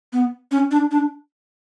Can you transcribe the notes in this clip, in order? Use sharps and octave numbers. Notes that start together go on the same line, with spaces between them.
B3
C#4
D4
D4